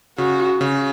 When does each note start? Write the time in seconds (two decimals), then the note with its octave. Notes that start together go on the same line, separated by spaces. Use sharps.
0.18 C#3 F#4
0.61 C#3